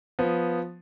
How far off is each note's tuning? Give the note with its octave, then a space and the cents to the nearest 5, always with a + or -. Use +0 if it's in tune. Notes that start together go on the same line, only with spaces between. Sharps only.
F3 +5 B3 +0